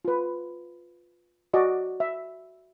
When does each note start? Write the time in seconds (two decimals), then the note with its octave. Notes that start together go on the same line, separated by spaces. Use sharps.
0.05 F4 B4
1.54 F#4 D5 D#5
2.00 E5